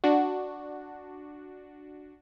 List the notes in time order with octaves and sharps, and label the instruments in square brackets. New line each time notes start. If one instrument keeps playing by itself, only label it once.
[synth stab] D4 F#4